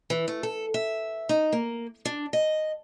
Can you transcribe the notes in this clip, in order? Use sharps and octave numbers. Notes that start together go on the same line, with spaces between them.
E3
A3
A4
E5
D#4
A#3
D4
D#5